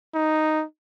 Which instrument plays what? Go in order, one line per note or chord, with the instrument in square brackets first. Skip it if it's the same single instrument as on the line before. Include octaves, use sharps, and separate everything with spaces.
[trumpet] D#4